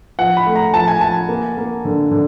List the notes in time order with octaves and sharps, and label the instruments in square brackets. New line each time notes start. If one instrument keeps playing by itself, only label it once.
[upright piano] F3 [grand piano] F#5
[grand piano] B5
[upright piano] A3
[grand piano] A#5
[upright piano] F3 [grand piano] A5
[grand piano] G#5
[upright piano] F3 [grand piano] A5
[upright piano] A#3
A#3
D3
D3